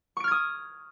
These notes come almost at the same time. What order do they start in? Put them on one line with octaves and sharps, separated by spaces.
C#6 D7 F6 G#6 D#6